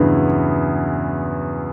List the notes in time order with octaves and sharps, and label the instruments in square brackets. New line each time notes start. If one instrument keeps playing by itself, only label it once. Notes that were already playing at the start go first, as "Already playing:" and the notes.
Already playing: [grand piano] E2 C#3 F#3 B3 E4 [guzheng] G2